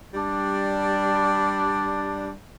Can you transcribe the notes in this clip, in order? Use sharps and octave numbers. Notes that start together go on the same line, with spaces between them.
G3 D4